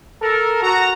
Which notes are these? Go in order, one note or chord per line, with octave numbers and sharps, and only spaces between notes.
A4 A#4
F#4 A#5